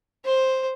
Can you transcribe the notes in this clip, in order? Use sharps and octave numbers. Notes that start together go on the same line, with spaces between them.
C5